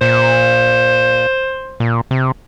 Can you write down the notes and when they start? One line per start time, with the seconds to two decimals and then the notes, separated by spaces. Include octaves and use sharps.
0.01 A#2 C5
1.80 A#2
2.11 C3